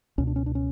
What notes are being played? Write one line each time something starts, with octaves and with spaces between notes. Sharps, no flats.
C#2 B2 C#4
D4
C#4
D4
C#4